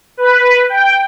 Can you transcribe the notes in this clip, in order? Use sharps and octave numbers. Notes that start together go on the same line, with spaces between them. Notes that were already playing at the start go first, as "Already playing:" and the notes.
B4
G5